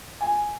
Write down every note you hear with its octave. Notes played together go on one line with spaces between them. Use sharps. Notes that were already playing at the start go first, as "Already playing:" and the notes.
G#5